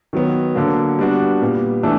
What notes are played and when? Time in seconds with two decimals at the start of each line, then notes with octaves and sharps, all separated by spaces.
0.13 D#3 F#3 B3
0.55 D3 F#3 A#3
0.99 G3 B3 D4 F#4
1.42 A#2 G3 B3
1.83 E3 A3 D4